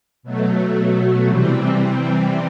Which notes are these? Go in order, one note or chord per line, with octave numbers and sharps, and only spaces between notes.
B2 F#3 A3
C3 E3 G3 C4